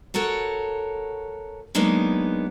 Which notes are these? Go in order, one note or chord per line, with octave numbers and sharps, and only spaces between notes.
F#4 A4 A#4 C#5
F#3 G#3 A#3 B3 D4 D#4